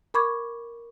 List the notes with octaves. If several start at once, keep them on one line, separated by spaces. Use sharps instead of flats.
A#4 B5 C#6 D6 G#6